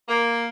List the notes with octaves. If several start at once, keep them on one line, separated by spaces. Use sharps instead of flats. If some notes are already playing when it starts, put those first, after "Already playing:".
A#3